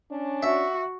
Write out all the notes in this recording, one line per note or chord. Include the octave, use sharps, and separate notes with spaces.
C#4 D4
F#4 E5